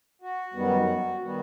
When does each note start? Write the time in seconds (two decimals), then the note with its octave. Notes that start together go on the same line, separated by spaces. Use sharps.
0.22 F#4
0.54 F#2 D#3 G3 B3
1.21 D#3 G3 B3 F#4